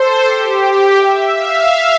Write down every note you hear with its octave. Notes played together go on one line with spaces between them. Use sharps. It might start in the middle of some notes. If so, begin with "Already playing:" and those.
Already playing: A4 C5
G4
E5
F5